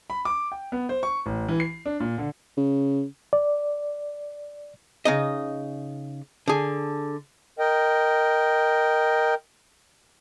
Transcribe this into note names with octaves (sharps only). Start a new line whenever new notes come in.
B5
D6
G5
B3
C5
C#6
A1
E3
C7
D4
A#2
D3
C#3
D5
C#3 D#4 D#5
D3 G#4
A#4 D#5 G5